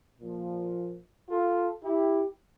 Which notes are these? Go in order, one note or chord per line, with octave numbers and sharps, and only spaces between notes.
A#2 F3
F4 A4
E4 G4